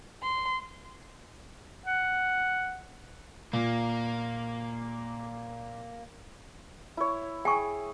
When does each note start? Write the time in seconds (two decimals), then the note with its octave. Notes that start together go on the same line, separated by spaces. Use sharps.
0.22 C6
1.86 F#5
3.53 A#2 A#3
6.97 E4 C#5
7.45 G#4 G5 G#5 C#6